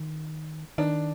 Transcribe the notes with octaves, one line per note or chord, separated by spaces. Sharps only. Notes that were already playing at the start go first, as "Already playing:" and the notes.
Already playing: D#3
D#3 D4